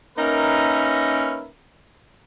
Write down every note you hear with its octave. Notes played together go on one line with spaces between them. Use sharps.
A#3 C#4 D#4 A#4 B4 E5